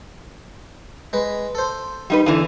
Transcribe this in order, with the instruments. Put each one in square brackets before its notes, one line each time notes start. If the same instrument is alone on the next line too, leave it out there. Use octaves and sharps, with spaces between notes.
[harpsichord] G#3 B4
A4 C5
[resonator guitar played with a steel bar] G3 D#4 B4
E2 D3 E3